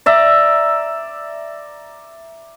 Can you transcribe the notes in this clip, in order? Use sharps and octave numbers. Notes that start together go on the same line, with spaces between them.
D5 E5 A#5